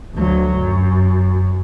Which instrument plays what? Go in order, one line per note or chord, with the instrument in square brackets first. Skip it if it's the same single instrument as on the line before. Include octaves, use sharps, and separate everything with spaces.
[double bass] D2 F#3
F#2